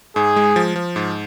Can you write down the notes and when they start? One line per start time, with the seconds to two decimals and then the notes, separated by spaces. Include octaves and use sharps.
0.16 G#2 G#4
0.36 G#3
0.56 F3
0.76 F3
0.96 G#2